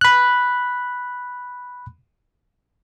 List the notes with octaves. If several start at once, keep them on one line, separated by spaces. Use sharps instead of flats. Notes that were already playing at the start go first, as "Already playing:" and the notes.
B5 F#6